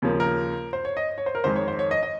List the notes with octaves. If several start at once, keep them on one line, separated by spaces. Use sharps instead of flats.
D#2 C#3 F3 A#3
A#4
C5
C#5
D#5
C#5
C5
A#4
F2 D#3 G#3 C5
C#5
C5
C#5
D#5
D#5